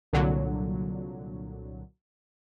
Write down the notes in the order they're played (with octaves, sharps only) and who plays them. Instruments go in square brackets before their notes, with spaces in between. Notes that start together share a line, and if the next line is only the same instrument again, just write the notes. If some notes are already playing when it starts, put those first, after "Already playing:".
[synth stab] C2 A#2 D3 F#3